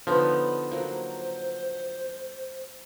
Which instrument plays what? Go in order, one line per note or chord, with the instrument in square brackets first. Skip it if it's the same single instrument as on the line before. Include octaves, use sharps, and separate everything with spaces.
[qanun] D3 B3 D#4 [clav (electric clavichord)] F3 [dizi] C#5
[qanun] F#3 A#3 [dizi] C5